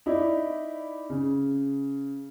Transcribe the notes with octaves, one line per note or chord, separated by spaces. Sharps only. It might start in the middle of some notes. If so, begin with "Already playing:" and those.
D#4 E4 D5
C#3